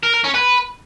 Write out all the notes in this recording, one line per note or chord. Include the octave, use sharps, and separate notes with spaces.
A#4
A#4
C#4
B4